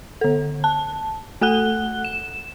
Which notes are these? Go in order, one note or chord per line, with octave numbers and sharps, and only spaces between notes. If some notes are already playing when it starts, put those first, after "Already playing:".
D3 A4
A5
A3 A4 F#5 F#6 G7
E7